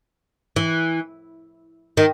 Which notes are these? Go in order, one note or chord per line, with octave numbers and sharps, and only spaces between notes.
E3
D#3